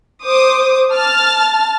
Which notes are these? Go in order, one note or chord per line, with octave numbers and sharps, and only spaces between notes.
C5 D6 D#6
A5 F6 A6